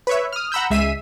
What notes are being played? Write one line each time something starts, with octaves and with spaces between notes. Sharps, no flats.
B4 C#5 E5
D#6 F6
F#5 A#5 B5 E6 G6
C#2 G#3 E5 B6 C7 D#7